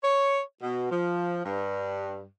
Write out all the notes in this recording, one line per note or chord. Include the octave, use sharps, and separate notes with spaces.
C#5
B2
F3
G2